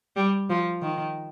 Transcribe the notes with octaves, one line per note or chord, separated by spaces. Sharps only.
G3
F3
D#3